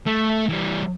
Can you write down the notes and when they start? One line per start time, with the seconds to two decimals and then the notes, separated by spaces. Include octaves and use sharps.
0.06 A3
0.49 E3 G3